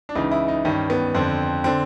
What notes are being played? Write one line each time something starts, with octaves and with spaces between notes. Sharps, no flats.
D4
C#2 C#3 E3 D#4
E4
D#4
G2 D#3 C#4
B3
F2 D3 C4
D3 C4